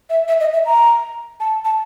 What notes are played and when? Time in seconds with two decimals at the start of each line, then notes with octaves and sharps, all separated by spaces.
0.10 E5
0.28 E5
0.40 D#5
0.53 E5
0.66 A#5
1.40 A5
1.65 A5